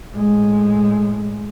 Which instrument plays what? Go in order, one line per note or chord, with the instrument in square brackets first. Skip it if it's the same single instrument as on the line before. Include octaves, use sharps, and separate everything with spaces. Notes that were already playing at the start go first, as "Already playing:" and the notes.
[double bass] A2 G#3